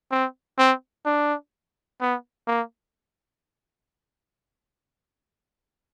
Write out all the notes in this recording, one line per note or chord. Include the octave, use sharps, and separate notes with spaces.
C4
C4
D4
B3
A#3